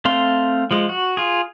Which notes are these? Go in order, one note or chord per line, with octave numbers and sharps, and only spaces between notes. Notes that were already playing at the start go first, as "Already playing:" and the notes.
A3 C4 F5 C6
F3 G#3
F#4
F4 G#4